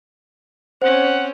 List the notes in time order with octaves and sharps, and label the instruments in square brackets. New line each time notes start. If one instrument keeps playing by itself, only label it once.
[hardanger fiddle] C4 C#4 [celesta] C5 [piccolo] F#5